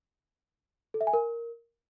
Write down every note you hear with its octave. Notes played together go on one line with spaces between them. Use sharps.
A4
E5
G#5
A#4